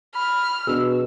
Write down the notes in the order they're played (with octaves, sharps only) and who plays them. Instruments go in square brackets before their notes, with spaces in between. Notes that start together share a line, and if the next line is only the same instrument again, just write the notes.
[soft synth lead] B5 [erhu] F6
[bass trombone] B2 [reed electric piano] D4 G#4 [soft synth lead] E6